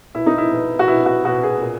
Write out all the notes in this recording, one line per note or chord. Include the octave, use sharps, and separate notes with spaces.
B2 E4
D#4
E4
B2
F#4
B2 E4
F#4
B2 F#4
G#4
A#2